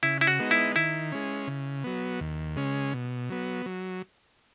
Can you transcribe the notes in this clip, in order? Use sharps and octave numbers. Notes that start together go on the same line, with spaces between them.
C#3 E4
E4
F#4
G#3 B3 D#4
E4
D#3 E4
G#3 C#4
C#3
F#3 B3
D#2
C#3 G#3 C#4
B2
F#3 B3
F#3